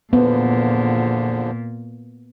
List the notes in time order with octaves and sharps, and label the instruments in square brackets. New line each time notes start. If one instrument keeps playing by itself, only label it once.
[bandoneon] E2 D3 F3 [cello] A#2 [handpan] B3